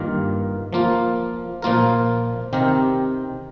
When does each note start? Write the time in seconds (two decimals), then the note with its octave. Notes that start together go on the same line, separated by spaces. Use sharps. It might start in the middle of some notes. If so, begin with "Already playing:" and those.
Already playing: G2 D#3 A#3 F4 A#4
0.73 F3 A#3 F4
1.62 A#2 F3 A#3 F4 A#4
2.53 C3 D#3 C4 G4 A#4